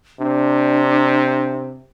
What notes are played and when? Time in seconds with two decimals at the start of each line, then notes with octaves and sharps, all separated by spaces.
0.20 C3 D4